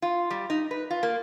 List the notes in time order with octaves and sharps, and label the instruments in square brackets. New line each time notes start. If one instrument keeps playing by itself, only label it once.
[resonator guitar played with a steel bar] F4
G3
D#4
B4
F4
A#3